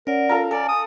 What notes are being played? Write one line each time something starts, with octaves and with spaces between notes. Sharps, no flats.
C#4 A#4 D5 F#5
F4 A4 F5 A#5
A4 D5 G#5
D#6